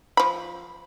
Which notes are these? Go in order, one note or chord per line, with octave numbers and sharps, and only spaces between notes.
F3 B5